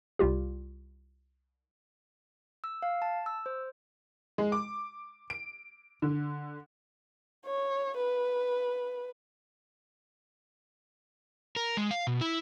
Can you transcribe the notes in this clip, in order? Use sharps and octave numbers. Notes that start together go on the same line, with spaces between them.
C2 G3 F4 G4
E6
F5
A5
E6
C5
G#3
D6
D7
D3
C#5
B4
A#4
G#3
F5
B2
E4